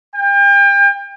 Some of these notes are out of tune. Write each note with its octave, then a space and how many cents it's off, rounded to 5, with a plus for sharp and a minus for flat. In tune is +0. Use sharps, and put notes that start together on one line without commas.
G5 +35